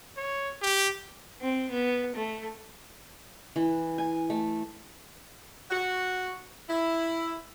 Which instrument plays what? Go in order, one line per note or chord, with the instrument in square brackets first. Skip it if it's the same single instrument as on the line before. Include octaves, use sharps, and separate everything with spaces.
[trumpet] C#5
G4
[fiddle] C4
B3
A3
[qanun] E3
G#5
A3
[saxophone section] F#4
E4